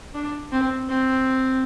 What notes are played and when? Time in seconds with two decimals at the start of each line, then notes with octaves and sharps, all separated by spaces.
0.14 D4
0.52 C4
0.89 C4